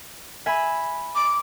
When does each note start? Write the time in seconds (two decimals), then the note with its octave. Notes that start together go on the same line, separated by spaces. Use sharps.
0.46 E5 G#5 B5
1.15 D6